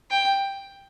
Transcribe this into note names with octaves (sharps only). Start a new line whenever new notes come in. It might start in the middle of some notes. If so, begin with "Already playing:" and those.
G5